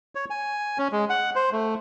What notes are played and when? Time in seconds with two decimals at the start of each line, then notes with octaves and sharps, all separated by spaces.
0.15 C#5
0.30 G#5
0.78 C#4
0.92 G#3
1.10 F#5
1.35 C5
1.52 A3